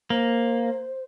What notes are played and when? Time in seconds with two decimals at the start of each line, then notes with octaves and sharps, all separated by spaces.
0.10 A#3 C5